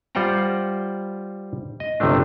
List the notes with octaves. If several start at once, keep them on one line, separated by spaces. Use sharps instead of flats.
G3 F4 C5 F#5 G5 A#5
D#5
G1 C3 F3 A3 D4